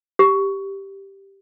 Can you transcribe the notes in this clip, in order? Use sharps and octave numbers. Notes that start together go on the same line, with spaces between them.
G4